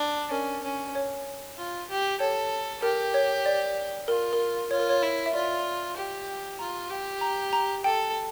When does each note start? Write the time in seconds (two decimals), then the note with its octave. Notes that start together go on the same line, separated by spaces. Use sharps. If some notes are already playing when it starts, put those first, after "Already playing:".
Already playing: D4
0.31 C#4 A#4
0.63 C#4
0.95 C#5
1.57 F4
1.89 G4
2.20 A4 C#5
2.82 G4 A#4
3.14 C#5
3.46 D5
4.08 F4 A#4
4.33 A#4
4.71 F4 C#5
4.80 A#4
4.89 C#5
5.02 E4
5.26 E5
5.34 F4 D5
5.97 G4
6.59 F4 A#5
6.90 G4
7.21 A#5
7.53 A#5
7.84 A4 G5